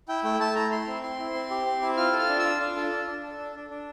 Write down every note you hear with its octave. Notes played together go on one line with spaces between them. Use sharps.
E4 G5
A3 G5
A3 A5
E4 A#5
E4 C6
C4
E4 C6
E4
C4
G4
C4
E4
F4 F6
A4
F6
D4
E6
F4
D4
A4
D4
D4
A4
D4
D4
D4